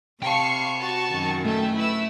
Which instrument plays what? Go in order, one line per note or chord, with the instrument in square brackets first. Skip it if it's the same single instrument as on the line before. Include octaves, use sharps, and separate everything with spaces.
[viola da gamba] C3 [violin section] F5 C#6 C7 [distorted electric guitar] G5 A5
[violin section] F#4 C#6 A6
[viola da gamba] F#2 D#3
[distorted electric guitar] A3 [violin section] A4 E5 G5
[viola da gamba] E4 [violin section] B4 E6